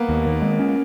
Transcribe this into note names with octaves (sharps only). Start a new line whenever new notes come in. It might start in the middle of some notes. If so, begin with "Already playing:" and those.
Already playing: A#3 B3
D#2
D#3
G#3
C#4